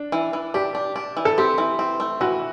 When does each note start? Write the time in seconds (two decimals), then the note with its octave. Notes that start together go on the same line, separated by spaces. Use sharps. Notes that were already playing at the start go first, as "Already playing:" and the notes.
Already playing: D4
0.12 E3
0.33 E3
0.54 D4 G4
0.75 D4
0.96 D4
1.17 E3
1.25 A4
1.38 C4 G4
1.58 E3
1.79 C4
2.00 A3
2.21 E3 F#4